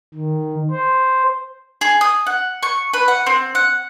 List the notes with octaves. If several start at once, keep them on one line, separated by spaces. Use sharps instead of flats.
D#3
C5
G#4
D#6
F#5
C#6
B4
F#5
C4
F#5